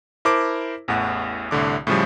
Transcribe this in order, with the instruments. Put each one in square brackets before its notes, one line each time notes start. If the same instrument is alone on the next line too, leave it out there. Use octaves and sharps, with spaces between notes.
[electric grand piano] E4 A#4 C5 A5 D6
A1 E2 A2 F#5
C2 A2 D3 D6
A2 C#3 F3 G3